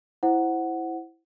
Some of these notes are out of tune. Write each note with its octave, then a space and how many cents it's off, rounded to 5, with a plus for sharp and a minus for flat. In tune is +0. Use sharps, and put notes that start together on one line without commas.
E4 +0 C5 +0 F#5 +0